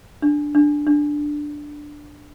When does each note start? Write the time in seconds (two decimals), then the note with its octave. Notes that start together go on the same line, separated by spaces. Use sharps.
0.22 D4
0.55 D4
0.87 D4